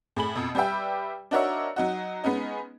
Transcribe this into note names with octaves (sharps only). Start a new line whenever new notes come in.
A2 G#4 B5 F#7
F2 B2
G3 G4 B4 E5 G5
D4 D#4 F#4 A#4 C#5 E5
F#3 D#4 F#4
G#3 B3 C#4 D#4